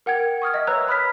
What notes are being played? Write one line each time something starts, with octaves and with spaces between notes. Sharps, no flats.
A#4 F#5 G5 G#6
C#6 D#6 F6 G#6
D#5 E5
B4 C#5 A#5 E6 F#6
A#5 B5 D#6 F6 B6